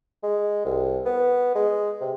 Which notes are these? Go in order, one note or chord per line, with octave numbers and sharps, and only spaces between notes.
G#3
C2
B3
G#3
C3